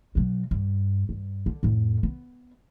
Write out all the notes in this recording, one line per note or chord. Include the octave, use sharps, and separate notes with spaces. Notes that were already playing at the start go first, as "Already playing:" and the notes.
B2 F#3
G2
G2
D3
F2 A2
B3